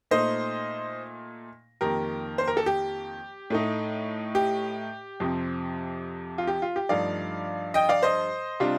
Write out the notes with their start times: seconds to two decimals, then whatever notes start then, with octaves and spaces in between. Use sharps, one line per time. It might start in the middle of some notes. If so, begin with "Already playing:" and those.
0.11 A#2 A3 D#4 C5 D#5
1.81 F2 D#3 A#3 G4 A#4
2.38 C5
2.48 A#4
2.57 A4
2.66 G4
3.50 A2 A3 D#4
4.35 G4
5.20 F2 C3 F3 C4
6.38 F4
6.47 G4
6.62 F4
6.76 G4
6.89 G2 F3 A3 D#4 D5 F5
7.74 D#5 G5
7.89 D5 F5
8.03 C5 D#5
8.60 C3 G3 D4 F4